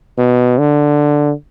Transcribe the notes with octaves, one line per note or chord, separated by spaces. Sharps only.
B2
D3